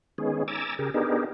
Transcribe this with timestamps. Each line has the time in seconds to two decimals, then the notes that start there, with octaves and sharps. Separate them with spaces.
0.18 D#3 G#3 B3 C#4 G#4
0.48 G#5 A#5 D6 E6 A6
0.79 C#3 G4 G#4 A#4
0.94 B3 D4 D#4 G4 G#4 A#4